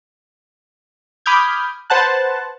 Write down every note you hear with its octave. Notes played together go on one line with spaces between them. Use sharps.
B5 D6 D#6 F6 G6 G#6
B4 C5 F#5 A5 F#6